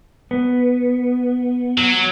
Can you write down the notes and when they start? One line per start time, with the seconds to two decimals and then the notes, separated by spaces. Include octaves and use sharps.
0.31 B3
1.78 F#3